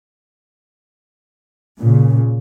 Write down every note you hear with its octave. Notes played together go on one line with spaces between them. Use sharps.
A#2 C#3